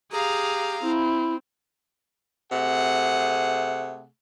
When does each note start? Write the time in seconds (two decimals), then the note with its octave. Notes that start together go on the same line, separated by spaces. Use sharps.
0.12 G4 G#4 F5 A#5
0.83 C4 E4
2.51 C3 A3 G#4 F#5